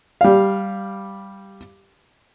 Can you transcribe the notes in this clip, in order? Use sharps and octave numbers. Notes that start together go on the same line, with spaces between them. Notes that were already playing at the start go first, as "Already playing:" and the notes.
G3 F5